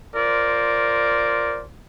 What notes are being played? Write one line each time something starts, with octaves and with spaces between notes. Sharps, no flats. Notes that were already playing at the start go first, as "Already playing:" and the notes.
F4 A#4 C5 D5